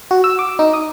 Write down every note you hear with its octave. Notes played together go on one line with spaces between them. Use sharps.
F#4
E6
D6
D#4
D#6